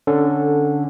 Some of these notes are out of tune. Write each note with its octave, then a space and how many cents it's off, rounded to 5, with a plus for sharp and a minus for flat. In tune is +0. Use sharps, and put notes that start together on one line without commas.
D3 +0 C#4 +0 A4 +10